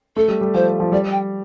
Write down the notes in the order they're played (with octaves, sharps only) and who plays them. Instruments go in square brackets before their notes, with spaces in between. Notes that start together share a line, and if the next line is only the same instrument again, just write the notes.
[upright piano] A3 [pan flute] A4
[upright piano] G3
G3
[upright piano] F3 [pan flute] C5
[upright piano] F3
[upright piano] G3 [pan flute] D5
[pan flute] G5